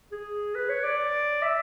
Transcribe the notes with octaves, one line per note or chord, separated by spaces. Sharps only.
G#4
B4
C#5
D5
E5